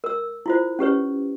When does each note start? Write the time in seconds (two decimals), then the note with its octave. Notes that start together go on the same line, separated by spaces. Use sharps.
0.04 A#4 E6
0.46 E4 F4 C5
0.79 C#4 G4 B4 C#5